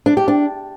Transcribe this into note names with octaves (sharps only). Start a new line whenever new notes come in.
D4
G4
D4